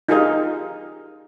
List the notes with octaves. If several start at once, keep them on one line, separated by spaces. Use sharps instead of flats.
D#4 F4 G4 G#4 A#4 D#5